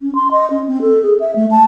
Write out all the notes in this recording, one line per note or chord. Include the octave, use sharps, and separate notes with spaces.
C#4
C6
D#5
C#4
C4
A4
G#4
E5
A3
A5